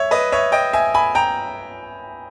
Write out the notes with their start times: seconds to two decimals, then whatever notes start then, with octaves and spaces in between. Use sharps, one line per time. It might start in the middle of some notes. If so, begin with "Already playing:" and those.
Already playing: C#5 E5
0.11 B4 D#5
0.32 C#5 E5
0.52 D#5 G5
0.73 E5 G#5
0.94 G#5 B5
1.15 G5 A#5